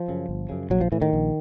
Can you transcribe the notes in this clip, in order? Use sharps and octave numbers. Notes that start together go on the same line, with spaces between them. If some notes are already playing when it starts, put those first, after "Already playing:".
Already playing: F3
F#2 C#3
G1
F#2 C#3
A#1 F#3
F3
A2 E3
D#3
A#1